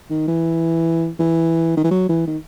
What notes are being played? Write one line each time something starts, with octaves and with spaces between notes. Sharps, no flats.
D#3
E3
E3
D#3
E3
F#3
E3
D#3